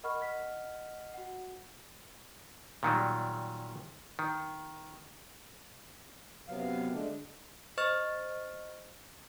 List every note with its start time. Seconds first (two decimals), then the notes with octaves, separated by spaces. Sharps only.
0.03 A#4 D#5 F#5 B5 C#6 F6
0.21 D#5 F#5 F6 B6
1.14 F#4 F#5
2.83 A#2 D#3 F#3 G3
4.19 D#3
6.49 F#2 C3 F#3 B3 F5
6.93 D3 G#3 A3 D4
7.78 C5 D#5 C#6 F6 A6